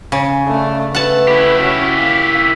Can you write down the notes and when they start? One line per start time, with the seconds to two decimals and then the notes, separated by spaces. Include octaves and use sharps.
0.12 C#3
0.45 A3 D4
0.95 A3 B4 F#5 A5
1.28 E4 G4
1.61 C#4 F#4
1.99 A#3 F5